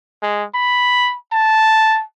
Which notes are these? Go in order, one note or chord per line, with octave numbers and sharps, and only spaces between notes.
G#3
B5
A5